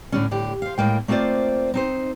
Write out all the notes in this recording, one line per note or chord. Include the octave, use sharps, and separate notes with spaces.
A2 D3 C#4
A2 D3 G4
C5 F5
A2 G#3 A#3 G5
A3 A#3 C4 F4 C5 D5
C4 D#4 C5